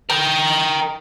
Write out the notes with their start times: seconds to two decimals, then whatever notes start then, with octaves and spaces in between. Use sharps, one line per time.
0.10 A#4 G5